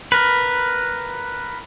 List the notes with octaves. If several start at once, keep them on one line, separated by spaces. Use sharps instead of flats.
A#4 B4